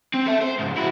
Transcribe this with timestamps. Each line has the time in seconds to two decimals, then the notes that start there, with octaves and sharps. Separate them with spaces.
0.14 C4
0.27 A4 E5
0.42 C5
0.60 C#2 G#2
0.77 E4 F#4